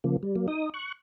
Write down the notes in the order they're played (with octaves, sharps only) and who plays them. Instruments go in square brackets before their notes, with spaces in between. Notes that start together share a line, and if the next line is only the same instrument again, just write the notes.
[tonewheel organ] C#3 F3 A#3
G3
F#3 A#3
D#4 D#6
C#6 F#6